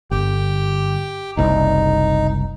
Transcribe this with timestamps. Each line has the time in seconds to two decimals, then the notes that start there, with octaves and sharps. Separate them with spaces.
0.11 G1 G4 G5
1.37 F#1 C2 D#4